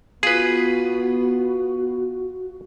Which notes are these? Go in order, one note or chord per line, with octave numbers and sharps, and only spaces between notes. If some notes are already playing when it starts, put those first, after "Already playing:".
B3 F4 F#4 G#4 B4